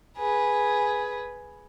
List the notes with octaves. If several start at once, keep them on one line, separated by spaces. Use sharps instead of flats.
G#4 B4